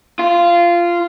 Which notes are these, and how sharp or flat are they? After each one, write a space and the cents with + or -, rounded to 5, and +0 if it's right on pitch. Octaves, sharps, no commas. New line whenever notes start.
F4 -15